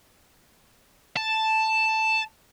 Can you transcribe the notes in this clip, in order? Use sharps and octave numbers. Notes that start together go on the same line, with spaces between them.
A5